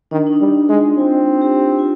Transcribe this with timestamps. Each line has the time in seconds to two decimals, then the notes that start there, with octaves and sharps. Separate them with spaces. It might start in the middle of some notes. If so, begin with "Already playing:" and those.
0.11 D#3 D4
0.27 D#4
0.33 D4
0.41 G3
0.55 D4
0.69 G#3
0.77 F4
0.98 C4 F4
1.42 G4
1.79 F4